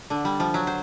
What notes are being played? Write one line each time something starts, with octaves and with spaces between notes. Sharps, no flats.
D3
G3
F3
F#3
C5